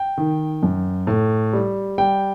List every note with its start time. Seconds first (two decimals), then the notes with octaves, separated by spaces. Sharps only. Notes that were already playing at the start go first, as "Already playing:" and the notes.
Already playing: G5
0.18 D#3
0.63 F#2
1.07 A2
1.53 G3
1.98 G3 G5